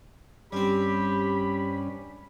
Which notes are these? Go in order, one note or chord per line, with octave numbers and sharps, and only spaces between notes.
G2 G3 C4 C#4 G4 B5